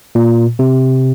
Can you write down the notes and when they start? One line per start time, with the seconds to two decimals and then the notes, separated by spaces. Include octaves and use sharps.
0.15 A#2
0.59 C3